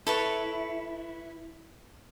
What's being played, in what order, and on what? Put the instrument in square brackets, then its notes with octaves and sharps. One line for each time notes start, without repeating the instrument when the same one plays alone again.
[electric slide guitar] E4 [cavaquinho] A4 B4 C#5